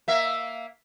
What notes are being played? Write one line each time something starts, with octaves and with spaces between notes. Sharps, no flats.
A#3 E5